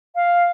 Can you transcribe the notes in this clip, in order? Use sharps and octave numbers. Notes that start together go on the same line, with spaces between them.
F5